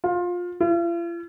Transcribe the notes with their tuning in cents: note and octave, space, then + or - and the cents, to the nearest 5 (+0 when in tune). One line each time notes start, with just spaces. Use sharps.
F4 +20
F4 -45